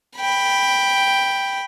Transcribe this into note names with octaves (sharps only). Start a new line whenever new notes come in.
G5 B5